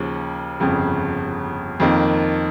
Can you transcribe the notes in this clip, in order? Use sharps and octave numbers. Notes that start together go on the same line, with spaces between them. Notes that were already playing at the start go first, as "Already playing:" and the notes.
Already playing: D#2 C#3 F3
G1 F2 C#3
F2 D#3 A#3